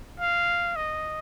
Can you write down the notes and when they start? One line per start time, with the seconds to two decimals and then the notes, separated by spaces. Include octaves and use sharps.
0.20 F5
0.76 D#5